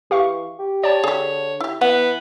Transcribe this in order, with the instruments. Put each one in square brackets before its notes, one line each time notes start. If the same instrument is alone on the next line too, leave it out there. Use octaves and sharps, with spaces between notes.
[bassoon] E3 [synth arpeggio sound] G4 F5 C#6
[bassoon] G4
[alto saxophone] C#5 [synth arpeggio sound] D5 A5
[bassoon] D3 [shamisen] G4 G#4
[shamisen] E4 G4
[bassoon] E3 [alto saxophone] B3 [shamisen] F#5